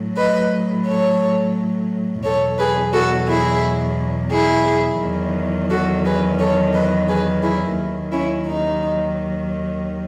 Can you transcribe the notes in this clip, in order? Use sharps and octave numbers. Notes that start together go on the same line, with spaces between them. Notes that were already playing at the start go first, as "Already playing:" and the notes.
Already playing: A2 F#3
B4 D#5
A4 C#5
E2 B2 F#3 A4 C#5
G#4 B4
F#4 A4
E4 G#4
E4 G#4
E2 D#3 F#3
F#4 A4
G#4 B4
A4 C#5
B4 D#5
G#4 B4
E4 G#4
D#2 D#3 F#3
C#4 E4
D#4